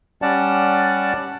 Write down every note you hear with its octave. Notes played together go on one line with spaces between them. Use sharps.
G3 C#4 D5 F#5 A5